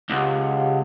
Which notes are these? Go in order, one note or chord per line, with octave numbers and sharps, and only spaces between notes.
C#2 G4 F5 F#5